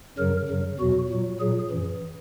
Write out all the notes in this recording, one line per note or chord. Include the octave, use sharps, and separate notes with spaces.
F#2 C#3 F#3 A#4
F#2 C#3 F#3
E2 B2 F#3 F#4
A#2 F#3
A#2 F#3 G#4
F#2 E3